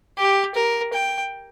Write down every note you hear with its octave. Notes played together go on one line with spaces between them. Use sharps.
G4
A#4
G5